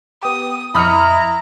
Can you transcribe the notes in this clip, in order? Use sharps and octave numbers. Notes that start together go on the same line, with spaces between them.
B3 G4 D#6
F2 E4 D#5 A#5 B5 C#6 D#6 F6